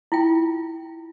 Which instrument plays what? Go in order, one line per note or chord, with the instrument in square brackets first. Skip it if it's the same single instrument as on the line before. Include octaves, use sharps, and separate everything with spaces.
[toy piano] E4 F4 G5